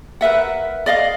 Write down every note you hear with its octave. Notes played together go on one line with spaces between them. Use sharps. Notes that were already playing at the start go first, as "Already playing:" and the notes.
A#4 B4 E5 F#5
D5 D#5 F5